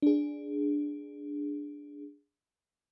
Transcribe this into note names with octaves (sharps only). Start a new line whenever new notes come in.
D4 G#4